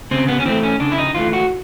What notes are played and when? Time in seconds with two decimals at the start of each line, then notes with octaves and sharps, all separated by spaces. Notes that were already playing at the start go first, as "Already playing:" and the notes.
0.11 C#3 C4
0.28 B3
0.40 C#4
0.45 E3 A3 C4
0.63 C#4
0.80 C#3 D4
0.92 E4
0.98 D#4
1.15 E3 A3 F4
1.33 F#4